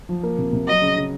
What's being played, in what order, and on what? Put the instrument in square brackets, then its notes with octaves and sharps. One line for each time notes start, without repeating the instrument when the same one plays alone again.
[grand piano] F3
A#3
C3
C3
[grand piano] F#3 [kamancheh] D#5
[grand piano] C#3
C#3